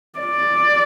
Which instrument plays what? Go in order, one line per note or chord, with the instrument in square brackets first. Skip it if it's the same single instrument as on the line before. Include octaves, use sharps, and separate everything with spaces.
[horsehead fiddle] D5